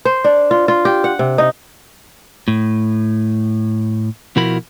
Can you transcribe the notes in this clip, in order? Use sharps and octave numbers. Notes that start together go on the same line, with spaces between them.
C5
D4
F4
F4
G4
F#5
C3
D#4
A2
B2 F3 E4 F#4 A#4 B5